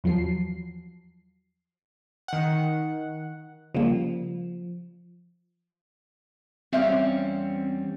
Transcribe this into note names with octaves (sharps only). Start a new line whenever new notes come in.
E2 F3 F#3 C7
D#3 F#5
C#3 F3 G3 A#3
E2 G3 C4 C#4 E5 F5